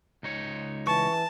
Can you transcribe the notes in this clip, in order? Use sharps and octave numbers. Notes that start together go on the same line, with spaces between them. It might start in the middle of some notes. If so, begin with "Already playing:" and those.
C#2 D#4 C#5
E3 A5 C#6